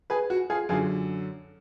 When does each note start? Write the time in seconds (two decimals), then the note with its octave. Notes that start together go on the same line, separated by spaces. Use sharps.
0.10 G#4 B4
0.30 F#4
0.50 F4 G#4
0.69 F#2 D3 F4 G#4